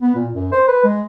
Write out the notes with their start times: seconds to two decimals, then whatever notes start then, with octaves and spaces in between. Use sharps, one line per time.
0.01 B3
0.15 A#2
0.33 F#2
0.52 C5
0.68 B4
0.84 G#3